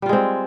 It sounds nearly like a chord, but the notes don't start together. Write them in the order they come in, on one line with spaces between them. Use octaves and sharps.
G3 F4 G#3 C4